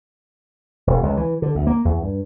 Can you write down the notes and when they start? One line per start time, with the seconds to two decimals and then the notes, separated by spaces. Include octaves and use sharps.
0.87 E1
1.03 C#2
1.17 E3
1.42 D3
1.55 D2
1.67 A#3
1.85 E2
2.02 G2